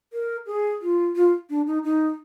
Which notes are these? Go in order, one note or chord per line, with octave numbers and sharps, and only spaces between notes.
A#4
G#4
F4
F4
D4
D#4
D#4